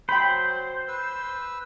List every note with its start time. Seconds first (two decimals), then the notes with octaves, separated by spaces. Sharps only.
0.09 F#3 C5 G5 B5
0.88 B4 E6